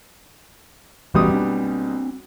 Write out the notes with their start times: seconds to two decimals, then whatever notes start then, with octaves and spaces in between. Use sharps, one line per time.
1.15 D#1 B1 E3 G3 C#4 D#6
1.32 C4 D4